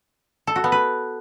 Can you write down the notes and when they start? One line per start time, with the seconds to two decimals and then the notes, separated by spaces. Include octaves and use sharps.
0.47 A4
0.56 F#4
0.64 B3
0.72 B4